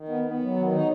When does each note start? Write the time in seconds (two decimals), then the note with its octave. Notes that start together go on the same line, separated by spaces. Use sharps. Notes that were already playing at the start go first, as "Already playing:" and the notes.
Already playing: D#3
0.09 B3
0.25 B3
0.41 F#3
0.57 D#3
0.72 D#4